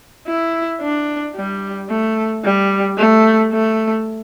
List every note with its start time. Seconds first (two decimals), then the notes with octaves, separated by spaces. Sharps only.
0.27 E4
0.81 D4
1.36 G3
1.90 A3
2.44 G3
2.98 A3
3.52 A3